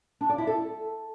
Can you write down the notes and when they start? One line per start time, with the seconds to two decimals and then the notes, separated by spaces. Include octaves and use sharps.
0.21 D4
0.29 D5
0.38 E4
0.47 A4